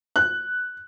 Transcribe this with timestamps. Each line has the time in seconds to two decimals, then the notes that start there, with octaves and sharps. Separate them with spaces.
0.16 F#6